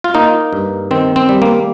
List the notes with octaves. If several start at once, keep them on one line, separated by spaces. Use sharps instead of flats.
F4
A#3 D#4
G2
D#3 C4
C4
G3
A#3